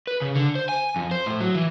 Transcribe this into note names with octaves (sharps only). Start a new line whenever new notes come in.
B4
C#3
D3
C5
G#5
F2
C5
A2
F#3
E3